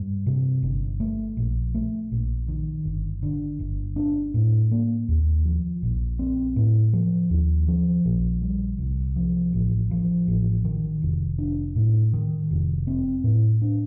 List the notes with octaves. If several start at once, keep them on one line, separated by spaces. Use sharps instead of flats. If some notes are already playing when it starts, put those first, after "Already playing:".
Already playing: G2
C3
G1
A3
A#1
A3
A#1
D#3
G1
D3
G1
D4
A2
A#3
D#2
F3
A#1
C4
A2
F3
D#2
F3
A#1
G3
C2
F3
A1
F3
A1
D#3
F1
D4
A2
D#3
F1
C4
A2
D4